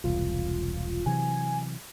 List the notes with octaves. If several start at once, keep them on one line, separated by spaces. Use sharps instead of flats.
E1 C2 F4
C3 E3 F#3 G#5